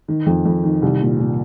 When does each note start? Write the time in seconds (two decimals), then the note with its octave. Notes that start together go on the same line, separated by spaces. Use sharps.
0.08 D#3
0.26 F2
0.45 F2
0.64 D#3
0.82 C2
1.01 A#2
1.19 A#2